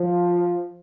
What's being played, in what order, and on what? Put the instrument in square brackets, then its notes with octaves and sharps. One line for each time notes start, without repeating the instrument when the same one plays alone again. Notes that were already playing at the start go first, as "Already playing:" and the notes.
Already playing: [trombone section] F3